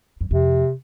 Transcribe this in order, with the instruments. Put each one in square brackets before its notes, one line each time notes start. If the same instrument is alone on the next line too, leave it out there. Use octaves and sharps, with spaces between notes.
[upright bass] F#2
[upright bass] F2 [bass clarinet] C3